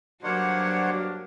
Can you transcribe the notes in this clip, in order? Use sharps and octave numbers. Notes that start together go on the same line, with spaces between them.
G2 F#3 A#3 D4 C5 C#5 F#5